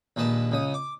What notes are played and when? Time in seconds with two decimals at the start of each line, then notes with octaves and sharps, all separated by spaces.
0.16 A#1 D#2 G#3 B4 A5
0.52 C#2 C#3 D#6
0.74 D6